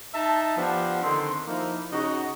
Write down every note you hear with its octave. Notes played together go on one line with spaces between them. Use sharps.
D#4 E5 A5
F3 B3 D4 G4 F#5
D3 D#3 C4 C6
F3 A#3 D#4 E4
C#3 D#4 F#4